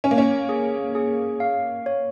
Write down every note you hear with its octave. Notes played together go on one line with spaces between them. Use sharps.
C#4 G#5
A#3
C#4
G#4
G#4
F5
C#5